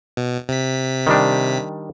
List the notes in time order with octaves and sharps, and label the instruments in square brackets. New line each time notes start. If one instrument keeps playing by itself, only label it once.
[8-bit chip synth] B2
C3 B6
[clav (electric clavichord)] D#3 G3 D4